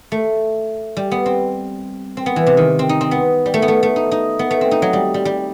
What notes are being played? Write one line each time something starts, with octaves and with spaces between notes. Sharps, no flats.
A3
G3
B3
C4
C4
B3
E3
C3
D#3
C4
D#4
C4
B3
G3
A3
B3
A3
A3
D#4
D#4
B3
A3
C4
D#4
F#3
G3
G3
G3